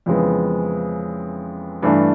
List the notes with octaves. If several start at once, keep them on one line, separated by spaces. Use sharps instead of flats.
F2 C#3 E3 G#3 B3
G2 E3 A3 D4